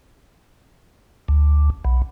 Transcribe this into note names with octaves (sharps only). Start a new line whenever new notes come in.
D2
B1